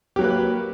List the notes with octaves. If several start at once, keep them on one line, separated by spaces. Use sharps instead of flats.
F#3 A#3 G4 B4